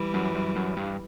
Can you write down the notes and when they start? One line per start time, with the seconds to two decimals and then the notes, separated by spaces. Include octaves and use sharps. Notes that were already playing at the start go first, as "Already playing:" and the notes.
Already playing: E3 G3
0.14 F#2
0.35 F#2
0.56 F#2
0.77 G2